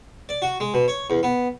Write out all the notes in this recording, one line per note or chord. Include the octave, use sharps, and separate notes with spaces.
D5
F#4
G#3
B2
C#5
E2
B3